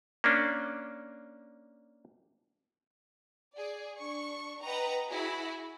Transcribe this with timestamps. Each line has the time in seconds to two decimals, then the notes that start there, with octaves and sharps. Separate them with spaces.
0.24 A#3 C#4 D4
3.56 G#4 D5
3.98 D4 C#6
4.63 B4 D#5 F#5 G5 A#5
5.08 E4 F#4 G#4